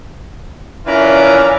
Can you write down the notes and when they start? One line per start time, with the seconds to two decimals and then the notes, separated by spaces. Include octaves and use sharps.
0.86 E3 C#4 D4 E4 F4 A#4